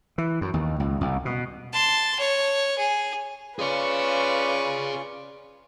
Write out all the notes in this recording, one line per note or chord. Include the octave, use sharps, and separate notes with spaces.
E3
F#2
D#2
C#2
C2
B2
A5 C6
C#5
G#4
C#4 F4 G#4 B4 C#5 D5 C#6